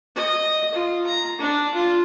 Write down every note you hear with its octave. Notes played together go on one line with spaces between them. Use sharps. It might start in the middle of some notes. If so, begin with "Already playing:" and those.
D#5
F4
A#5
D4
F4